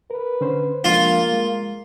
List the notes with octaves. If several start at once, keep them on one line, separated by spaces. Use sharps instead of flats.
A#4 B4
D3 C#4 C5
F3 G#3 A#3 D4 F4
G#3